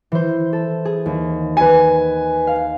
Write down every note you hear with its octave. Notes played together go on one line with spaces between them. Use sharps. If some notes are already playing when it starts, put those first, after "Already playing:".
E3 C5
A4
G#4
D#2
B4 G#5
F5